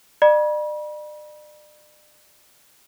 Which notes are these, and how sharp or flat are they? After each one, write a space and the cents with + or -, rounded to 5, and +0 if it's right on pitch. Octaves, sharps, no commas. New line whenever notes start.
D5 +40 B5 -45